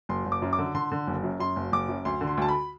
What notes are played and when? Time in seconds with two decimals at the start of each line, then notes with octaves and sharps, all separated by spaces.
0.09 F#1 C6
0.26 F#1
0.32 D6
0.42 F#2
0.53 D6
0.59 D3
0.75 D3 C6
0.92 D3
1.07 F#1
1.23 F#2
1.40 F#2 C6
1.56 F#1
1.72 F#1 D6
1.89 F#2
2.05 D2 C6
2.21 D3
2.27 C6
2.37 D2 A5
2.49 B5